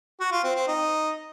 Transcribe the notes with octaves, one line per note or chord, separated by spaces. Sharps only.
F#4
F4
C4
C4
D#4